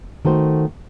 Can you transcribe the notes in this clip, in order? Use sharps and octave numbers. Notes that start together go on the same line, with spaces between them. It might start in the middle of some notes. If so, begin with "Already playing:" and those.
D#3 A3 F#4 C5